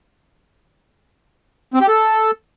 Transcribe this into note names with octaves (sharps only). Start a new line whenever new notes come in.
C4
G4
A4